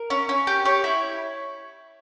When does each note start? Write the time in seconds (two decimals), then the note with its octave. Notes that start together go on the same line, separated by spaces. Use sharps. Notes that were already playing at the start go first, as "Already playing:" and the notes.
Already playing: A#4
0.10 C#4
0.29 C#4
0.47 G4
0.65 G4 C#5
0.84 E4